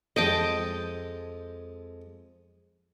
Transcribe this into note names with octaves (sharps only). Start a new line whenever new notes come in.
F2 G#3 D#5 G5 A5